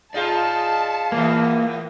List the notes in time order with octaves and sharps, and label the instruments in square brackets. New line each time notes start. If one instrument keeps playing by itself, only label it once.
[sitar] D#4 F4 G#4 [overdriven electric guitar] D5 F5 [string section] A5
[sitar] A2 E3 B3 [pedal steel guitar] A#3